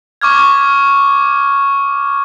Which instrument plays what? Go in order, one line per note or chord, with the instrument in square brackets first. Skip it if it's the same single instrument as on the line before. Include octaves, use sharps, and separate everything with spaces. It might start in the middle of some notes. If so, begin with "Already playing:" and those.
[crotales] C#6 D6 F6 G#6